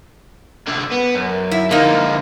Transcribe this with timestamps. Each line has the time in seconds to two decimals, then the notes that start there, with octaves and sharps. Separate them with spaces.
0.67 C2 D3
0.91 B3
1.15 F#2
1.51 E4
1.71 D3 F3 A#3 D#4